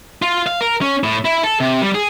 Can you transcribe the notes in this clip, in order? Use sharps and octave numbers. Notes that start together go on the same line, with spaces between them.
F4
F5
A#4
C#4
A2
E4
A4
C3
G3
G#4